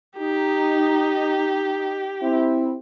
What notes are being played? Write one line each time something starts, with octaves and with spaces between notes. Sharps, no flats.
D#4 G4
C4 E4